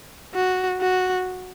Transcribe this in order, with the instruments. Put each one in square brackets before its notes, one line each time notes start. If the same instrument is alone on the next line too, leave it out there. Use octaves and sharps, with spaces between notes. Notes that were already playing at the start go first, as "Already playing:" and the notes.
[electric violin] F#4
F#4